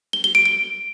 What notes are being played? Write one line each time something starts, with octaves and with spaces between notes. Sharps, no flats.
G7
G7
D7
D7